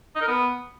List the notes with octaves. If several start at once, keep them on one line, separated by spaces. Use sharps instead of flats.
D#4
A#4
B3